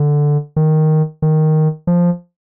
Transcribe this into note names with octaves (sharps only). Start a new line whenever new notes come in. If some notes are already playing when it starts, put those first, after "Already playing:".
Already playing: D3
D#3
D#3
F3